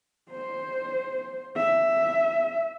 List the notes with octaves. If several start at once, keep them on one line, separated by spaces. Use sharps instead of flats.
C5
E5